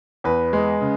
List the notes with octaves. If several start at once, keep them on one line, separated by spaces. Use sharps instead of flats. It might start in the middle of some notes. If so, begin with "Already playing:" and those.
E2 B4
G#3
C#3